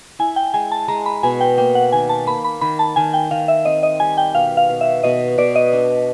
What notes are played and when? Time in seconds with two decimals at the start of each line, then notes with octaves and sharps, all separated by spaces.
0.19 E4 G#5
0.36 G5
0.54 G#3 G#5
0.72 A5
0.88 G#3 A#5
1.06 B5
1.23 B2 G#5
1.41 G5
1.58 A#3 G5
1.75 F#5
1.92 D#3 G#5
2.09 A5
2.26 A#3 B5
2.44 B5
2.61 D#3 B5
2.79 A5
2.96 D#3 G#5
3.14 G5
3.31 D#3 F5
3.48 E5
3.65 C4 D#5
3.83 D#5
4.00 G3 G#5
4.18 G5
4.34 B2 F5
4.57 F5
4.69 B2
4.81 E5
5.03 B2 D#5
5.38 B2 D5
5.56 D#5
5.73 D4